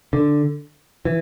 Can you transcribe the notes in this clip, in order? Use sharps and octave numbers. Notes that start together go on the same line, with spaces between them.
D3
E3